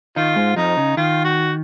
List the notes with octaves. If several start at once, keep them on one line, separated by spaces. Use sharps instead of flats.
D#3 D#4 F4
G#2 G#3
F2 F3 D#4
C#3
D#3 F4
F#4